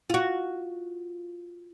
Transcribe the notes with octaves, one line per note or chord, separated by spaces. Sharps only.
F4 F#4